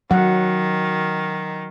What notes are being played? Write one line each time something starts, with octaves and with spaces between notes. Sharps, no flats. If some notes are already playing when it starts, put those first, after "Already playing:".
D#3 F#3 F#5